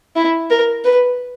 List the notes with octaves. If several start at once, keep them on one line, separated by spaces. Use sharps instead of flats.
E4
A#4
B4